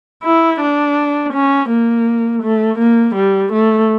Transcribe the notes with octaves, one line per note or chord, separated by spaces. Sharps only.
E4
D4
C#4
A#3
A3
A#3
G3
A3